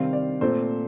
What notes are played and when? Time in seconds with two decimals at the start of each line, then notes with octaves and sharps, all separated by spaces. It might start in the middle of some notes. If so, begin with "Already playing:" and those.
Already playing: C3 D#3 G3 C4 F5
0.13 D5
0.41 A#2 A3 C4 C5